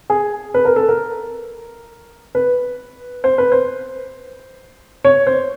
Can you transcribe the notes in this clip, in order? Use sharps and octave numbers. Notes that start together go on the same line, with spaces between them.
G#4
B4
A#4
A4
A#4
B4
C5
B4
C5
C#5
C5